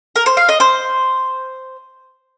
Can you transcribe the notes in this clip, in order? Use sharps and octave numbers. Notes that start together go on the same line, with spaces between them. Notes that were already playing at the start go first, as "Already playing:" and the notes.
A#4
C5
F5
D#5
C5